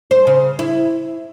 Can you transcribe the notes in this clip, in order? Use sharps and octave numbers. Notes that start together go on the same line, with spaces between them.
C5
C#3
E4